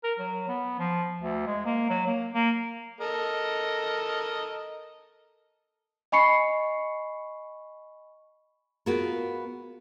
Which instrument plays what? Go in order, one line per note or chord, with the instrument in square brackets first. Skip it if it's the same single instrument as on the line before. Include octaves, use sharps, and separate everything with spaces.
[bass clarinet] A#4
F#3
B3
F3
D2
G#3
A#3
F#3
A#3
A#3
[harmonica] A4 A#4 D#5
[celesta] D#5 G#5 B5 C#6 C7 C#7
[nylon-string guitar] B3 F4 F#4 G#4 A#4